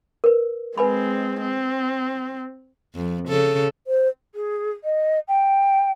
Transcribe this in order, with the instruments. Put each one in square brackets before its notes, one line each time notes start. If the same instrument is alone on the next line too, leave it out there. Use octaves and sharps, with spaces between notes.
[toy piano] A#4 B4
[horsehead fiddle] G#3 C4 [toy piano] B4 G#5 B5
[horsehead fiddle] C4
[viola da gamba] F2
C#3 A4
[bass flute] C5
[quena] G#4
D#5
G5